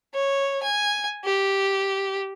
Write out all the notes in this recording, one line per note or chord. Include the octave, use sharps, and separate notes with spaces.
C#5
G#5
G4